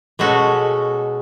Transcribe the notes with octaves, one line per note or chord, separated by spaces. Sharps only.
B2 G#3 C#4 F#4 A4